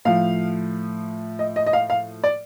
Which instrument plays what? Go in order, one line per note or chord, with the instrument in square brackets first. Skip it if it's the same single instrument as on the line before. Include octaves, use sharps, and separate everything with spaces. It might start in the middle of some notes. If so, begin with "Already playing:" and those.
[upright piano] A2 F3 F5
D#5
D#5
D#5
F5
F5
D5